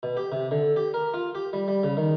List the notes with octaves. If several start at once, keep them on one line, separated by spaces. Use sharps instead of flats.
B2
G4
C3
D3
G4
A#4
F4
G4
G3
G3
C#3
D#3